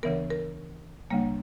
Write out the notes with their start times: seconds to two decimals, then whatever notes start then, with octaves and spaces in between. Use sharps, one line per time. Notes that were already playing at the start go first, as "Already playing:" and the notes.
0.03 D2 C#3 E3 B3 A#4
0.30 A#4
1.11 D2 C#3 G3 A#3